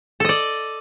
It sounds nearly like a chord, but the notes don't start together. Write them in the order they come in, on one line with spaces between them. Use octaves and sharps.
A4 D#5 D5